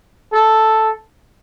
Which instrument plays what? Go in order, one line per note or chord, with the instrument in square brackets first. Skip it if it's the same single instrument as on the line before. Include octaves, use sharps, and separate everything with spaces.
[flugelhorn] A4